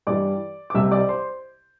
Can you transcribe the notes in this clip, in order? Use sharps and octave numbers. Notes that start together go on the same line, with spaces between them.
G2 E3 G3 D5 D6
D6
C2 C3 G3 E5 E6
D5 D6
C5 C6